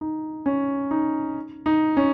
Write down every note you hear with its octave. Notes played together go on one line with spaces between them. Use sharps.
D#4
C#4
D#4
D#4
C#4